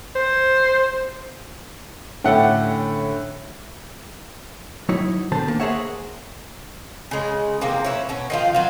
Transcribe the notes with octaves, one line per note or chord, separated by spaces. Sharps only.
C5
A2 D3 A3 C#4 G4 A4 F#5 G5
F#3 D#4 E4 C#5
E2 D3 D#3 C5 A5
A#3
G#4 A#4 C5 C#5 E5 F#5
C#3 G#3
C3 E3 A#3
C#4 E4
B2 C#4
D#3 F3 F4
F#3 F4